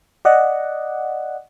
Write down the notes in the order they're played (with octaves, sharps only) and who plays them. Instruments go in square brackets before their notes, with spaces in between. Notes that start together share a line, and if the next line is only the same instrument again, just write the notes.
[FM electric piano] D5 D#5 F#5